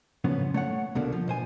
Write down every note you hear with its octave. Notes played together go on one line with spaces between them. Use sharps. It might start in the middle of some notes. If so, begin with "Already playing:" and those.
A2 C#3 F3 F#3 B3 C#4
A3 C#5 F#5
C2 B2 D3 A#3
F3
B2 C5 G#5